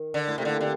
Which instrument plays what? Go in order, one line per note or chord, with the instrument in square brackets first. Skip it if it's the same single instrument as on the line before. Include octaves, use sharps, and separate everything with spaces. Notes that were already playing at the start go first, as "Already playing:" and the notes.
Already playing: [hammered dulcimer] D#3
[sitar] D3
[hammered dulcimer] A2
[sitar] C3
[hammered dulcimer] A#2 [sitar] D3
[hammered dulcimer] C3
[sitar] D3